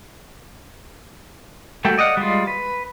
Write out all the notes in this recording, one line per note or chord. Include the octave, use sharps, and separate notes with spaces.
G3 A3 F#4 A4 G5
D5 D#5 F5 F#5
G3 G#3 F4
B4